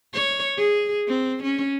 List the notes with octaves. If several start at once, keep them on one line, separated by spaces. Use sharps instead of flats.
C#5
G#4
C4
C#4